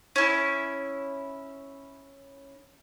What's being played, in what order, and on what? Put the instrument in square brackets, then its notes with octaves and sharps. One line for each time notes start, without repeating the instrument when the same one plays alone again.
[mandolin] C#4 E4